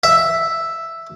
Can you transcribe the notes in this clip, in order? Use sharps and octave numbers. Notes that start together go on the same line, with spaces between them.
E5